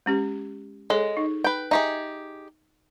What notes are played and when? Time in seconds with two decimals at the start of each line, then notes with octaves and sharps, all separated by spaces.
0.06 G#3 C#4 G4
0.90 G#3 G#4 A4 C#5
1.17 D#4
1.44 B4 G5
1.71 D#4 G4 G#4 E5